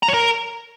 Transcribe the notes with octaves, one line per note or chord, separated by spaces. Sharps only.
A#5
C#5
A#4